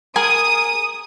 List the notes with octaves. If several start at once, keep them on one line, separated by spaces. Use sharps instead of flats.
G#4 A#4 G#5 D#6